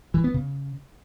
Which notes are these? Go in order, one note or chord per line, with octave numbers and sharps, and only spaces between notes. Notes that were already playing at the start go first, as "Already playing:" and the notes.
E3
B3
C#3